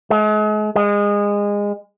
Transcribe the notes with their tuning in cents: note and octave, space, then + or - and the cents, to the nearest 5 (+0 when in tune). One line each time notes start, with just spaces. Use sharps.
G#3 +40
G#3 -25